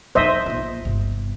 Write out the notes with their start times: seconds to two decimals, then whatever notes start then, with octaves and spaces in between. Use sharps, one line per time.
0.15 F#2 D#4 C5 D#5 E5
0.46 A#1 F4
0.85 G1 C3